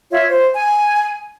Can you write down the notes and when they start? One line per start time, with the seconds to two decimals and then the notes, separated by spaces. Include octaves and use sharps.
0.10 F4 C#5 E5
0.28 C5
0.55 G#5